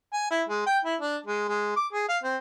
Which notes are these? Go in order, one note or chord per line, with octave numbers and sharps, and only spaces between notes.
G#5
E4
G#3
G5
E4
D4
G#3
G#3
D6
G#4
F5
C4